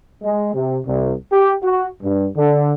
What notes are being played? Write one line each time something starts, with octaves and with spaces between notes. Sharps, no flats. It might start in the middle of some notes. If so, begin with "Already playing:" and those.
G#3
C3
C2
G4
F#4
G2
D3